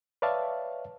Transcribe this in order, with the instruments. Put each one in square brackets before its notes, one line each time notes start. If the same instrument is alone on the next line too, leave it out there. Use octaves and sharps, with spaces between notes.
[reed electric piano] B4 C#5 D5 E5 F5 A5